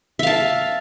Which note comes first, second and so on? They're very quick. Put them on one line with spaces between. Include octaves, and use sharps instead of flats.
E5 F5 A5